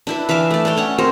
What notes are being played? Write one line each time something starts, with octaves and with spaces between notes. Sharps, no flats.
D4 E4 B4
E3 E5 F5 D6
A3 D5
D4 A4 C#5 G5
C#4 C#5 F#5
C4 G#4 A#4 C5